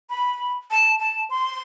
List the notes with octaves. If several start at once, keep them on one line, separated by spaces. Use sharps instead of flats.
B5
A5
A5
C6